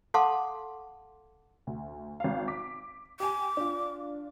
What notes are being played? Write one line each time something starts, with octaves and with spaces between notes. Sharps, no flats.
A4 F5 F#5 A5 C6 D6
D2
G#1 F5
D6 B6
G4 G#5 D6
D4 F4